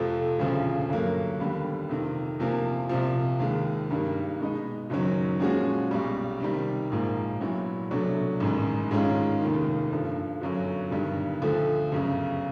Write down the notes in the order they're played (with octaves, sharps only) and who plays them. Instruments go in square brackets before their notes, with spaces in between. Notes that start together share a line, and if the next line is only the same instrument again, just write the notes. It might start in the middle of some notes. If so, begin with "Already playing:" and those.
Already playing: [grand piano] F2 C3 F3 A3
E1 D2 C#3 F3
G2 D3 F#3 A#3
D#2 D3 G3 B3
F2 C3 D#3
E2 C3 F3 A#3
C2 C3 F3
D#2 D#3 G#3
G2 D#3 G3 A#3
B2 G#3 B3 D#4
F#1 F#2 D#3 F#3
A#2 F3 G#3 C#4 F#4
B1 B2 G3
C3 D#3 G3
A#1 G#2 F3 A#3
A#1 A#2 F#3 B3 E4
C2 B2 F#3 A3 D4
A1 G#2 D#3
G#2 D#3 G#3 C#4 F4
F1 D#2 D#3
G2 D3 F3
G1 F#2 D3 F#3
G1 G2 D#3 G3
D2 D3 F3 A3
G1 F#2 C#3